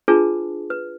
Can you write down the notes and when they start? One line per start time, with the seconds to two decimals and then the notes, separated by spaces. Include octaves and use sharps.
0.08 D4 F4 G#4 B4 A5
0.70 B4